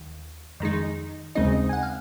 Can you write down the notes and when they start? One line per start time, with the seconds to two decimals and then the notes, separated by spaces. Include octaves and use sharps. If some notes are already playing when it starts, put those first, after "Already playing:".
Already playing: D#2
0.60 F2 D#3 G#3 D#4
1.35 D#2 C#3 G#3 C4 D#4 D#5
1.69 G#5
1.73 F#5
1.83 F5